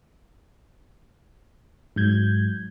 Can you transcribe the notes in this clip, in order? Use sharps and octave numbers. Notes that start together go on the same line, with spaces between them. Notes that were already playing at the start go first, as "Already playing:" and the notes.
G#2 F#3 G6 G#6